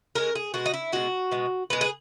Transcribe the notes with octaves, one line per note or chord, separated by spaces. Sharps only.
C#3 G#3 A#4
G#4
B2 G#3 F#4
D#4
E4
B2 G#3 F#4
B2 G#3
B2 G#3 B4
G#4